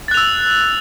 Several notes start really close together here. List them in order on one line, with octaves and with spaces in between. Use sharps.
A6 F#6 F7 E6